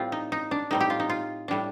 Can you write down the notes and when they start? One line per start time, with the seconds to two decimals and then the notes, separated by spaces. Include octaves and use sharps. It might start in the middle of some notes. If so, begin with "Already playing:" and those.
Already playing: A2 G3 C4 F4
0.12 D#4
0.32 D#4
0.51 D4
0.71 A2 G3 C4 D#4
0.81 G4
0.90 F4
1.00 D#4
1.10 F4
1.48 A2 G3 D4